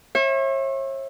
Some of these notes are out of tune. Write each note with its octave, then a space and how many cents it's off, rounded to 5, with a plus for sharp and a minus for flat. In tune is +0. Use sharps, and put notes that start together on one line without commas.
C#5 -40 E5 +0